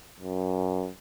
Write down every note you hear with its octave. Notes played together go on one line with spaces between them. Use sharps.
F#2